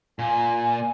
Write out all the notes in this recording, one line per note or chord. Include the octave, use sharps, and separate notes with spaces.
A#2 G#5